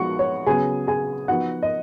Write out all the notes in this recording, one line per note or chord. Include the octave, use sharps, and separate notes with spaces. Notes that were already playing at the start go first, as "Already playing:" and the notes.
Already playing: F3 G#3 B3 D#4 F#4 F#5 C#6
C#5
C#3 F#3 B3 G#4 G#5
G#4 G#5
F3 B3 D#4 F#4 F#5
D#5